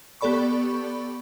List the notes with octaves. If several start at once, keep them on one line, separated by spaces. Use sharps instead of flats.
B3 G4 A4 D5 B5 C#6